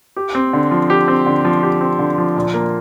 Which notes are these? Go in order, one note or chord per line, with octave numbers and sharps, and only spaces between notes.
G4
C4
D3
F3
G4
C4
D3
F3
G4
C4
D3
F3
A#2
A#3